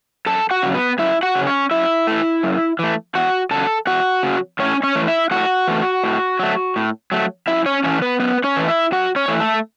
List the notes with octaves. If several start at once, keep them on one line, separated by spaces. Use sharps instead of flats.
F#2 A4 A5
F#4 F#5
C#3 F#3
B3 B4
F#2 E4 E5
F#4 F#5
C#3 F#3
C#4 C#5
F#2 E4 E5
E3 A3
F#2
E3 A3
E2 F#4 F#5
C#3 F#3 A4 A5
E2 F#4 F#5
C#3 F#3
A2 C#4 C#5
C#4 C#5
E3 A3
E4 E5
A2 F#4 F#5
E3 A3
A2
F#3 A3
A2
F#3 A3
F#2 E4 E5
C#4 C#5
E3 A3 C#4 C#5
B3 B4
F#2 B3 B4
C#4 C#5
E3 A3
E4 E5
F#2 F#4 F#5
C#4 C#5
E3 A3
A3 A4